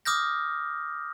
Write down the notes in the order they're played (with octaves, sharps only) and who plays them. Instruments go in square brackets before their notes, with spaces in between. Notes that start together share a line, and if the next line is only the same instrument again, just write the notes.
[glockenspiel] D6 D#6 F6 G6 A#6